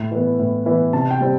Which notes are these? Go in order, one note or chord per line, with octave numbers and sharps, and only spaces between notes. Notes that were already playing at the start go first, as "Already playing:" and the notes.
Already playing: A2
E3 B3
A2
E3 B3
C3 A5
G5
G3 C4